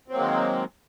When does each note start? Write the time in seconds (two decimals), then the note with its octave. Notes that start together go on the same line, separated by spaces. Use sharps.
0.08 C4
0.11 F#3
0.14 A#3
0.17 G#3
0.20 D#3